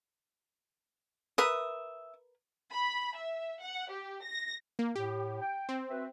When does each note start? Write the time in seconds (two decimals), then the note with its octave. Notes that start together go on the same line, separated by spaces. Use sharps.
1.38 A#4 B4 E5 D#6
2.72 B5
3.16 E5
3.61 F#5
3.91 G4
4.23 A#6
4.79 A#3
4.96 A2 G4
5.41 G5
5.69 C4
5.90 F#4 B4 E5